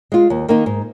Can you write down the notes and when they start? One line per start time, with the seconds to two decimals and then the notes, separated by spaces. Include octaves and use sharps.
0.12 G#3 F4
0.30 D#2
0.49 D#3 A#3 D#4
0.66 G#2